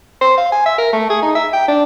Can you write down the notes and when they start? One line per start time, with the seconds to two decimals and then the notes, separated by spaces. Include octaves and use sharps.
0.21 C5
0.38 F5
0.52 G#5
0.66 E5
0.78 A#4
0.93 A3
1.10 G#4
1.22 D#4
1.35 E5
1.53 G5
1.68 D4